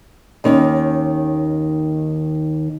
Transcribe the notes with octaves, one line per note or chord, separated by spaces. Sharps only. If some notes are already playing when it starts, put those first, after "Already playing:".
D#2 D#3 C#4